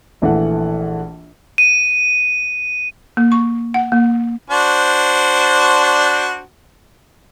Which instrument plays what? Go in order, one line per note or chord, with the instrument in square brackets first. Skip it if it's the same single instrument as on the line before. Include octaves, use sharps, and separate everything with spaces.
[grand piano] A#1 E3 A3 F#5
[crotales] D#7
[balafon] A#3
C#6
F#5
A#3
[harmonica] D4 F#4 C5